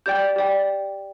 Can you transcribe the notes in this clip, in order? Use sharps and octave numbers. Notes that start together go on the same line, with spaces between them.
G4 D5 G5 G6
G4 D5 G5